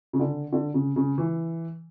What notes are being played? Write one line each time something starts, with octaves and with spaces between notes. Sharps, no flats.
C#3
D3
D3
C#3
C#3
E3